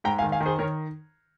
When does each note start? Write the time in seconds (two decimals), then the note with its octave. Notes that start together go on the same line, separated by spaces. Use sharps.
0.04 G#2 G5 A#5
0.18 F5 G#5
0.22 D#3
0.32 F5 G#5
0.40 D#3
0.46 G#4 C5
0.59 D#3 A#4 C#5